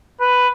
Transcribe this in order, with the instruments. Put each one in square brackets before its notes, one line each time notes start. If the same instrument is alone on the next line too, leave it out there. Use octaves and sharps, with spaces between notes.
[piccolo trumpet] B4